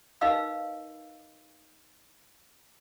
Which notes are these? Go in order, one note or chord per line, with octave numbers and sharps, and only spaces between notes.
D#4 A#4 B4 D#5 F5 E6